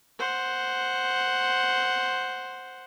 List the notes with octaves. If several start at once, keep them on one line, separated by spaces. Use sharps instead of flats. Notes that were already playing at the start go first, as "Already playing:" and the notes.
C5 F#5